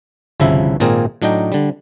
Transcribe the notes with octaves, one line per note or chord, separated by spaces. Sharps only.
G1 C2 C#3 F3 E4 E5
G#1 A#2 A#3 C4 G#4 A#4
A2 F#3 D4 D#4 D#5 G5
D3 G3